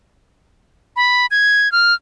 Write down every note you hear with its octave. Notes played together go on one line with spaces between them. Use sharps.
B5
G#6
F6